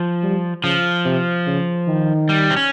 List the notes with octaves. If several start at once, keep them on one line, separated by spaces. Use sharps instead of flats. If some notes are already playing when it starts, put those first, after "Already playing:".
Already playing: F3
G3
C#3 F3
C3
C#3
D#3
G3
C4
C#4